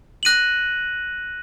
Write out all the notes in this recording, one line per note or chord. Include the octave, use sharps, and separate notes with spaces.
F#6 A#6 D#7 F#7